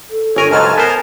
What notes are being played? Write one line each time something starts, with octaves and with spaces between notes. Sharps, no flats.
A4
G1 A#4 C#5 G#5
C#2 G#2 F#3 G#5 A5 F6
B3 A#4 C5